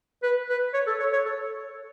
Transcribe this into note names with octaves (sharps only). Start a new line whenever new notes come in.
B4
B4
C#5
A4
C#5
C#5
A4